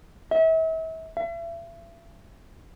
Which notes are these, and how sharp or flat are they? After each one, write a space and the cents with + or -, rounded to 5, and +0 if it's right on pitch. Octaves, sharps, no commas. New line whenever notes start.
E5 -35
E5 +40